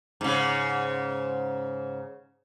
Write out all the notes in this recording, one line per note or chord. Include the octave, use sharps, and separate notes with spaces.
G#2 C#3